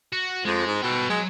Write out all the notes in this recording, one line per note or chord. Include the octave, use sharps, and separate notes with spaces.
F#4
F2 G#3
G#2
B2 A4 G5
F#3 G#3